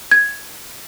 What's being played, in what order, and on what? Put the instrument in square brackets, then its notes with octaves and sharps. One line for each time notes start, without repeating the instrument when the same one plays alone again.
[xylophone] G#6